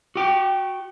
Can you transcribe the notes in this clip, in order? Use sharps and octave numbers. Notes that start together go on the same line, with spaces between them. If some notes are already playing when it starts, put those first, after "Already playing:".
F#4 G5